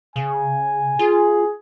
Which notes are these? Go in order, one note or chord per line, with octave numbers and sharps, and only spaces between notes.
C#3 G#5
F4 G#4